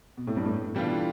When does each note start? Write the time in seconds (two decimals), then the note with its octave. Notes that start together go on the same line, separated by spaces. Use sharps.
0.17 B2
0.27 A2
0.37 G2
0.45 A2
0.75 B2 E3 G3 D4 F4 A4